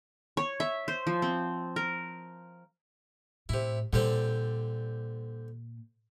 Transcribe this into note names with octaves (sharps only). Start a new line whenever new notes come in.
C#5
E5
C5
F3
C4
A#4
A2 C3 E4
A#2 D3 G3 C4